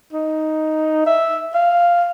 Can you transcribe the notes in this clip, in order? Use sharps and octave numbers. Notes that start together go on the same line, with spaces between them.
D#4
E5
F5